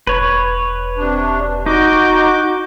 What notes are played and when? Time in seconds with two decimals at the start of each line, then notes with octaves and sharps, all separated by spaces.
0.07 E1 B4 C#5
0.97 C3 D4
1.66 D#4 F#4 D6 G6